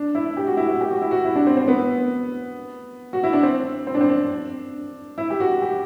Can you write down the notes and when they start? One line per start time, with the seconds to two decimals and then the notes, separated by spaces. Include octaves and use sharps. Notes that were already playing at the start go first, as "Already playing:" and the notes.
Already playing: D4
0.15 E4
0.37 G4
0.47 F#4
0.57 E4
0.68 F#4
0.81 G4
0.91 F#4
1.02 E4
1.11 F#4
1.25 E4
1.36 D4
1.47 C4
1.57 C4
1.68 B3
3.13 F#4
3.24 E4
3.33 D4
3.43 C4
3.87 C4
3.95 D4
4.01 C4
4.09 D4
5.18 E4
5.30 G4
5.40 F#4
5.62 G4